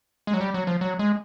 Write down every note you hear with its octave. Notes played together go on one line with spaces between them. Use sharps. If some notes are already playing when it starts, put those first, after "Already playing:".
G#3
F#3
G3
F#3
F3
F#3
G#3